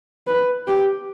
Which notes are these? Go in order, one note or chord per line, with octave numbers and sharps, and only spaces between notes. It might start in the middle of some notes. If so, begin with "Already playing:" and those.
B4
G4